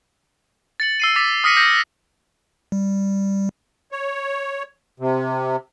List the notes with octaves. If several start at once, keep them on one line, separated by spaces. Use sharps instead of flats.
A6 C#7 F#7
E6 C7 D#7
D6 A6 B6
D#6 F6 A#6 B6 C#7 D#7
G6 A#6 C#7
G3
C#5
C3